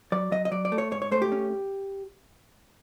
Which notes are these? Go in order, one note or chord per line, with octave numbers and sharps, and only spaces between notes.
F#3 D5
F#3 D#5
D#5
F#3 D5
D5
A3
C#5
G#2 C#5
C#5
A3 C5
G4
C#4